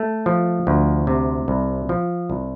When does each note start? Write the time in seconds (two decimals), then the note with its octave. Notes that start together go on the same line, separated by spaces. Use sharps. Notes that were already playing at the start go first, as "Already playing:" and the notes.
Already playing: A3
0.26 F3
0.67 D2
1.07 C3
1.48 C2
1.89 F3
2.30 C2